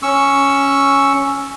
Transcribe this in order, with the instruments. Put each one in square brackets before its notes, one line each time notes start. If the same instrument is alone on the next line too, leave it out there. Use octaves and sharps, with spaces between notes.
[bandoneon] C#4 C#6 E6